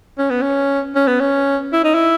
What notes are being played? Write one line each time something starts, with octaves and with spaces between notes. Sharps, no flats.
C#4
B3
C#4
C#4
B3
C#4
E4
D#4
E4